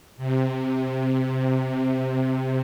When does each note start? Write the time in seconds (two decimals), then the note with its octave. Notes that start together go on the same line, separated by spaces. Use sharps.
0.17 C3
1.24 C3